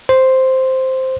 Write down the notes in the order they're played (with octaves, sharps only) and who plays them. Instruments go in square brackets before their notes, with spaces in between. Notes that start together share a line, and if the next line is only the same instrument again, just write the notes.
[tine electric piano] C5